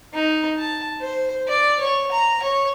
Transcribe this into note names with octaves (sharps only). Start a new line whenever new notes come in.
D#4
A5
C5
D5
C#5
A#5
C#5